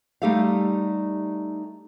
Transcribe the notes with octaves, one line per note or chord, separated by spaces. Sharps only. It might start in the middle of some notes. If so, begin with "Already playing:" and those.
G3 A3 D#4 G4 A4 F5